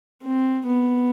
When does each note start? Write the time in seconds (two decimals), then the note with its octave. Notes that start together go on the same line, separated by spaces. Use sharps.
0.23 C4
0.66 B3